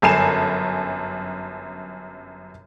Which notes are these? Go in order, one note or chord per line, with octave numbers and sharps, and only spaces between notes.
G1 F#2 A4 G#5 C7 E7